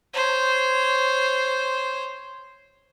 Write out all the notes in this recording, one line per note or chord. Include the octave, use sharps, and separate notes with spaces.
C5 C#5